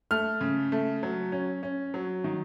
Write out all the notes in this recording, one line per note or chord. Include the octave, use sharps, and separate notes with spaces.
A3 F6
C#3
A3
F#3
C#4
C#4
F#3
D#3